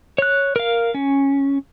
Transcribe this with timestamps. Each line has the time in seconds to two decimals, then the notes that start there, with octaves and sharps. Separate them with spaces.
0.18 C#5 F#6
0.56 A#4 F5
0.94 C#4